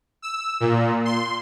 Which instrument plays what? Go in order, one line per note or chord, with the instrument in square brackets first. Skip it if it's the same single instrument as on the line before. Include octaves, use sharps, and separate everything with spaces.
[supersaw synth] E6
A#2
C6